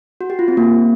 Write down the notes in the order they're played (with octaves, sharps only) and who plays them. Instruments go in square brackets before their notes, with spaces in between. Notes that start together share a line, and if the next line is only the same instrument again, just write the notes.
[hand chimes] F#4
G4
F4
C4
A#3